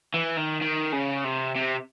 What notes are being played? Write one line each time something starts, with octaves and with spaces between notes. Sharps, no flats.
E3
D#3
D#3
C#3
C3
C3